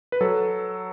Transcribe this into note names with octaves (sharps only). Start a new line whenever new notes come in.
B4
F#3 A4